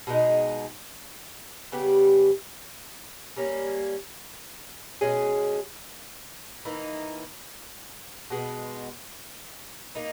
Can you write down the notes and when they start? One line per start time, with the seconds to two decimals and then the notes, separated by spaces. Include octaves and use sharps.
0.07 B2 G#3 D#4 G#4
1.72 C#3 G3 B3 G4
3.36 G3 A#3 C#4
5.01 B2 G#3 C#4 G#4
6.65 E3 A#3 D#4
8.30 B2 G#3 B3
9.95 A#3 D#4